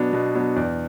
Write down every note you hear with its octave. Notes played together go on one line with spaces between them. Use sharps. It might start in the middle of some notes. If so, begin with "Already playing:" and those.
Already playing: B2 F#3 B3 D4
B2
F#3 B3 D4
E2 D5